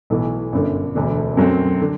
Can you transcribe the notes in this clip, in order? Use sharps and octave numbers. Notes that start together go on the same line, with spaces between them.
B1 A2 E3
G1 F#2 D3
E1 D2 D3 A3 D4
F#2 F#3 A3 C4
D3